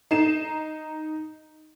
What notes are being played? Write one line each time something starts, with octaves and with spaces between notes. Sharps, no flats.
D#4 C7 E7